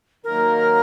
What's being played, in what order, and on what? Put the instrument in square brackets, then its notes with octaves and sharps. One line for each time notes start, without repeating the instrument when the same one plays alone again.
[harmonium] D#3 F#3 A#3 D#4 [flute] A#4